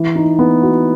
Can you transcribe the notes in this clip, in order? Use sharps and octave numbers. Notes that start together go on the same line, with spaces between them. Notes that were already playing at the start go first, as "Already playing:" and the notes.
Already playing: E3
D#4
B3
F#4